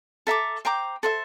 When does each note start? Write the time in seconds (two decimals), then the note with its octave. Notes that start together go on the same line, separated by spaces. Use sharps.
0.27 A4 E5 A#5 D6
0.65 C5 G5 A#5 D6
1.03 A4 C5 E5